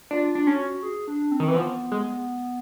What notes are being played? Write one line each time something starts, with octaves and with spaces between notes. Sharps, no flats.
D4 F4
D4
C#4 F#4
G#4
D4
C4
D#3
E3
F3 B3
G#3